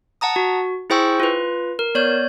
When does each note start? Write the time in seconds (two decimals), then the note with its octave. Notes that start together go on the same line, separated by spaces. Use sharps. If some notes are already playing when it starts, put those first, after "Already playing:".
0.21 F#5 A5 A#5 D#6
0.36 F#4
0.90 E4 G#4 C5 G5 C#6 E6
1.20 F4 B4
1.79 A#4
1.95 B3 C#5 D5 G6